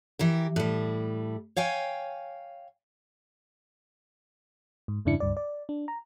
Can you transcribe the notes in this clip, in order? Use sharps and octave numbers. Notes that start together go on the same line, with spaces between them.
E3 G4 A#4
A2 G3
C#5 F5 G5 G#5
G#2
E2 G2 C#3 D4 E4 C#7
C#2 G2 D5
D5
D4
A#5